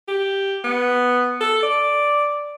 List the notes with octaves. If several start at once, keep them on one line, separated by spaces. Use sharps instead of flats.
G4
B3
A4
D5